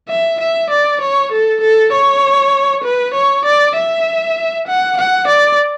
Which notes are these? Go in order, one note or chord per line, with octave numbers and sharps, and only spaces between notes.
E5
E5
D5
C#5
A4
A4
C#5
B4
C#5
D5
E5
F#5
F#5
D5